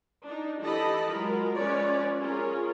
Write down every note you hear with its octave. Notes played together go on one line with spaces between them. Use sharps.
D4 D#4
E3 G4 A4 D#5 A5 B5
F#3 G#3 F4 A#4
F3 G#3 C#4 B4 C#5 D5
C#4 F4 G#4 A#4